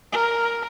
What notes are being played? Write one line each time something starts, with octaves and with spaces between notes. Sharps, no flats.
A#4